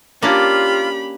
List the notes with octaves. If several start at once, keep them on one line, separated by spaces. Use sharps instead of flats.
A#3 C#4 D4 F4 G4 B5